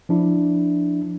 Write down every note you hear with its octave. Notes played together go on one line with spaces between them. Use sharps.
F3 D4 E4